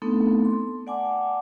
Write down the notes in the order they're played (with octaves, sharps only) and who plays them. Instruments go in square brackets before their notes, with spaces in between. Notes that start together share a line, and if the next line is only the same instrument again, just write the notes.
[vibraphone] A3 B3 C4 D4 D#4 A4
C6
D5 F#5 G#5 A5 D6